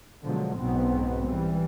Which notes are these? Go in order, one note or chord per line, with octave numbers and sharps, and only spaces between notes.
B2 D3 F3 F#3 G#3
B1 G#2 B2 B3 C4
E3 G3